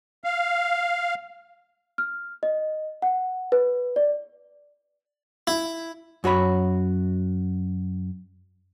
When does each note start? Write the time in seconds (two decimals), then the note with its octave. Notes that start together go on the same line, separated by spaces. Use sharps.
0.24 F5
1.98 F6
2.43 D#5
3.02 F#5
3.52 B4
3.96 D5
5.47 E4
6.24 F#2 F#4 C#5 B5